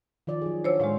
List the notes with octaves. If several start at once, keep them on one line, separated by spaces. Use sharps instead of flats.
D#3 F3 D5
F#3 G#4
D4 F#4 C5 C#5 E6
A2 G#3 C5 F5